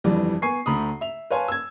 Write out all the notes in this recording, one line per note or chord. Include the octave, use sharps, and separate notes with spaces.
G1 F2 E3 G3 D5
B3 G#5 C#6 C7
D2 A3 A#5 B5 D#6
E5 F7
B4 C#5 F5 G#5 A5 C6
E6 G#6